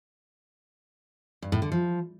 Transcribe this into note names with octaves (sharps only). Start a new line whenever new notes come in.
G2
A2
D3
F3